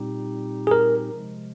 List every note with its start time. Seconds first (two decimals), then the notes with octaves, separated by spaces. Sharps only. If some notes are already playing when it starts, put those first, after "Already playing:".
Already playing: A#2 G3 C4 D#4 G4
0.67 G#4
0.71 A#4
1.11 C3 F3 G#3